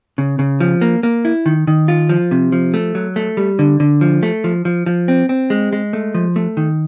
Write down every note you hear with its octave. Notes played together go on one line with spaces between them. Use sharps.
C#3
C#3
F3
A#3
A#3
E4
D#3
D#3
F4
F3
C3
F3
A3
F#3
A3
G3
D3
D3
F3
A3
F3
F3
F3
C4
C4
G#3
G#3
A3
F3
A3
D#3